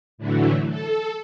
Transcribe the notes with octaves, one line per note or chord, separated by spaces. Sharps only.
A2 D3 E3 F#3 A3
A4